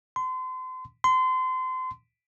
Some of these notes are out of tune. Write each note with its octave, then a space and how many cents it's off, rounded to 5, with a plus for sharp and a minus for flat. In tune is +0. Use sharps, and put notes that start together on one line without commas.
C6 -35
C6 -30